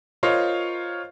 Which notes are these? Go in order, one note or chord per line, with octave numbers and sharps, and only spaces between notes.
F4 A#4 C5 C#5 D#5 F5